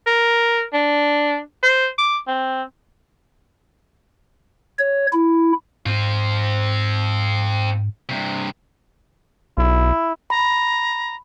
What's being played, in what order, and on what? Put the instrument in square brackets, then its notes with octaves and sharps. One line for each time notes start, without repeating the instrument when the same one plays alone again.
[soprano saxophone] A#4
D4
C5
D6
C4
[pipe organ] C#5
E4
[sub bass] G#2 [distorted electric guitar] C4 F4
[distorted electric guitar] G2 C3
[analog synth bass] B1 [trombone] E4
[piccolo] A#5 [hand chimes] B5